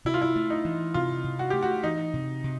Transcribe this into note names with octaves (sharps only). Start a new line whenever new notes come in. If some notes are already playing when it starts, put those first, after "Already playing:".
C3 E4
F4
E4
A3
D#4
E3
C3 F4
C3
F#4
A3 G4
F#4
E3 D#4
C3
C3